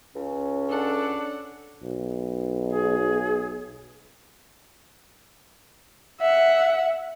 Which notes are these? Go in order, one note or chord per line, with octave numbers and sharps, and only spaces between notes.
C#2 C#4
D4 A4 F#5
B1
G#4
E5 F#5